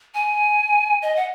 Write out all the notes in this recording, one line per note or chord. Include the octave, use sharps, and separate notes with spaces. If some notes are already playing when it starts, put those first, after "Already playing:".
G#5
D#5
F#5